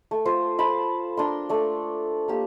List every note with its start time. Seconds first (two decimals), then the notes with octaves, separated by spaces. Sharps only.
0.11 A3
0.25 F4 C5
0.59 C5 A5 B5
1.17 D4 A#4 C6
1.49 A3 D5
2.28 A#3 G4